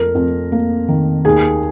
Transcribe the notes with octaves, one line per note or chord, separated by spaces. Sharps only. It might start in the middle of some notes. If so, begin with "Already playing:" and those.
Already playing: F2 A#4
F2
A#3
D#3
D#2 G#4